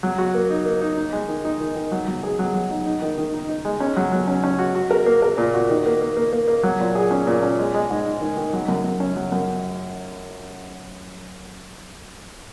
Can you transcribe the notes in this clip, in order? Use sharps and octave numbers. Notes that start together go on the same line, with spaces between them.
F#3
F#4
A#3
D#4
A#3
D#4
D#4
G#3
D#3
D#4
D#3
D#3
F#3
F#3
G#4
F#3
F#3
D#4
D#4
D#3
D#3
D#4
D#4
G#3
C#4
F#3
F#3
C#4
C#4
F#4
F#4
A#4
A#3
A#4
A#2
F#4
D#3
A#3
A#3
A#3
A#3
A#3
F#3
A#2
G#4
C#4
A#2
C#4
G#3
G#3
G#2
G#2
D#3
D#3
F#3
F#2
F#2
C#4
F#3
F#2